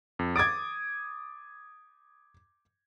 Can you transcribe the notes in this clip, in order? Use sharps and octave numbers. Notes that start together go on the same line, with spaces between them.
F2
D6 D#6 G#6 A6 D7